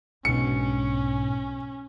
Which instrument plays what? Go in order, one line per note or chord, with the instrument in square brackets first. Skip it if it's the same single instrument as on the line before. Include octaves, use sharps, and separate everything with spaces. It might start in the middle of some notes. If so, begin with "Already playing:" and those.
[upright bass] B1 D4 [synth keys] G#2 B2 [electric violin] C#4 [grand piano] C#7